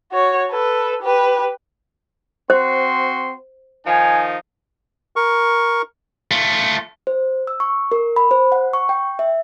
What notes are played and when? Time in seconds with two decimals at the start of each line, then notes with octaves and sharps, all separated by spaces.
0.11 F#4 C#5
0.50 A4 B4
1.02 G4 B4
2.50 C4 F#4 C5 C6
3.87 D#3 F3 D#4 G#5
5.16 A#4 C#6
6.31 A3 F4
7.07 C5
7.47 E6
7.60 C#6
7.92 A#4
8.16 B5
8.31 C5
8.52 F#5
8.73 C#6
8.89 G5
9.19 E5